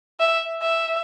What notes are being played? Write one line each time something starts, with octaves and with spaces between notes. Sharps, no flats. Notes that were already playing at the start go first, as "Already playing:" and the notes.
E5
E5